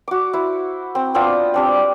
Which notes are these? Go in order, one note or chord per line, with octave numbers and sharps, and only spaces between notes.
F#4 D6
E4 C5
C4
B3 C4 D4 F4
C4 D4 G4